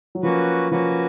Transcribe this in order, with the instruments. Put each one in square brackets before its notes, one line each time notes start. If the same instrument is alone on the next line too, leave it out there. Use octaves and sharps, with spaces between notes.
[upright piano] F#3
[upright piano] F3 [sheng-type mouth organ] A#3 C#4 F#4 B4
[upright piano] F3 [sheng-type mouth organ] A#3 C#4 F#4 B4